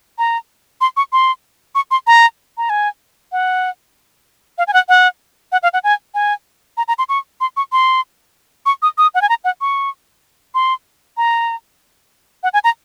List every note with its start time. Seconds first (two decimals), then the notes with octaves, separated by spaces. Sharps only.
0.18 A#5
0.81 C6
0.97 C#6
1.13 C6
1.75 C#6
1.91 C6
2.07 A#5
2.58 A#5
2.70 G#5
3.32 F#5
4.58 F5
4.67 G#5
4.73 F#5
4.89 F#5
5.52 F#5
5.63 F5
5.73 F#5
5.84 G#5
6.15 G#5
6.77 A#5
6.88 A#5
6.98 C6
7.09 C#6
7.41 C6
7.57 C#6
7.72 C6
8.66 C#6
8.82 D#6
8.98 D#6
9.15 F#5
9.22 G#5
9.29 A#5
9.44 F#5
9.61 C#6
10.55 C6
11.17 A#5
12.43 F#5
12.54 G#5
12.64 A#5